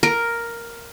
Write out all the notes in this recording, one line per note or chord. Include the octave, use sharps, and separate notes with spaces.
A#4